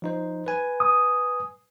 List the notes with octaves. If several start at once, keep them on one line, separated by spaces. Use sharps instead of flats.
F3 D#4 C5
B4 G#5
D#6